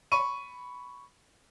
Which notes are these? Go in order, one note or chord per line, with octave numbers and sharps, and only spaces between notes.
B5 C#6 D#7